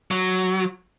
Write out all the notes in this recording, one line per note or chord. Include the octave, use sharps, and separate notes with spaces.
F#3